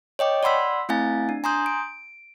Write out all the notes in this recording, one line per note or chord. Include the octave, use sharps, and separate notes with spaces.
C#5 D#5 G5 D6
D5 F#5 B5 C6 E6 B6
A3 C4 E4 F5 G#5 A6
D4
G#5 A#5 C6 D#6 G6
D7